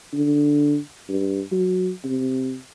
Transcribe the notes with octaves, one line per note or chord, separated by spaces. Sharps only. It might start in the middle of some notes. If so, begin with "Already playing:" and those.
D3
G2
F#3
C3